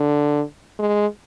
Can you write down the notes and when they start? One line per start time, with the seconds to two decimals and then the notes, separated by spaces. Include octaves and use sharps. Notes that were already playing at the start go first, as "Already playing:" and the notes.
Already playing: D3
0.79 G#3